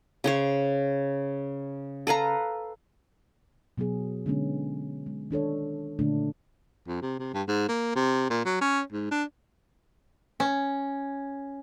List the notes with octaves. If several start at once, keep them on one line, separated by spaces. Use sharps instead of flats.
C#3 C5 C#5
A4 B4 F5 A#5
B2 F#3 B3 G#4
D3 G#3 B3 C#4
G#3
D#3 D4 A4 C#5
A#2 D3 A3 D4
F2
C3
C3
G2
G#2
A#3
C3
A#2
F#3
C#4
G#2
D4
C#4